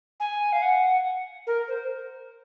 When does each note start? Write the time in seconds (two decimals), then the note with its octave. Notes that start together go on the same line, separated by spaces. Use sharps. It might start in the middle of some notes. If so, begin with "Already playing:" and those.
0.20 G#5
0.53 F5
0.62 F#5
1.47 A#4
1.68 C5